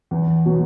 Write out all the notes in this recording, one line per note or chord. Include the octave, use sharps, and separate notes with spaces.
E2
B2 F#3